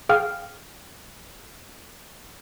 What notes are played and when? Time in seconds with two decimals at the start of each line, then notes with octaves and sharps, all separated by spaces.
0.09 G#4 F5 G5 F6